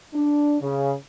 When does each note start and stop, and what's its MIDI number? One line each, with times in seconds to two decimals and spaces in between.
0.14 0.56 62
0.61 0.92 49